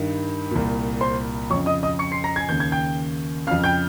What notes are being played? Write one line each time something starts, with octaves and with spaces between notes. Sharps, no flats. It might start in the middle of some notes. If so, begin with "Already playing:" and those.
Already playing: G2 D#3
C2 A#2
C5 C6
F2 C#3 C#5 C#6
D#5 D#6
D#5 D#6
C#6 C#7
C6 C7
A#5 A#6
G#5 G#6
D#2 C#3 G6
G#6
G5 G6
F2 C#3 F5 F6
G5 G6